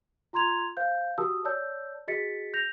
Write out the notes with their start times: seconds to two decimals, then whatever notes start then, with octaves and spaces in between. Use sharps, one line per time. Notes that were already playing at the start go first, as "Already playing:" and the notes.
0.33 F4 A#5 C6 G#6 F7
0.77 C5 F5 G6
1.18 F#4 G4 A#4 A5 D#6 E6
1.45 C#5 D5 A5 E6 G6
2.08 F#4 G#4 D#5 A6 B6 C#7
2.54 G6 A#6 F7